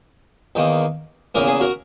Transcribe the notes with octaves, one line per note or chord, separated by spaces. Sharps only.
E2 D#3 A#3
E2 C#3 E3 A#3 A#4
G#4
F#4 A#4